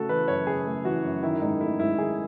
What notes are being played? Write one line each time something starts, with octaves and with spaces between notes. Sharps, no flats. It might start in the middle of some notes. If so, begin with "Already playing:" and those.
Already playing: C#3 A3 F#4 A4
E3 B4
F#2 C#5
C#3 G#4
A3
E3 F#4
F#2
D#3 E4
G#2 D#4
A3 E4
G#2 E4
D#3 G#4